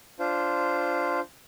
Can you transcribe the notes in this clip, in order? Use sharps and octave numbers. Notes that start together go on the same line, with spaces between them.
D4 F4 C5